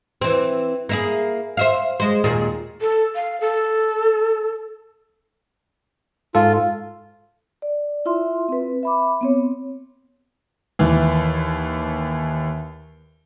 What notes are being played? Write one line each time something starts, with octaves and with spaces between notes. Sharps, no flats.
E3 C4
A#3 E4 G#4
C5 E5 F5
G#3 C5
D#2 A#2 G#4
A4
F5
A4
G#2 F4 A4
D5
E4 F4 E5 C6
C4 B4
E5 B5 D6
B3 C4 C#5
D#2 E3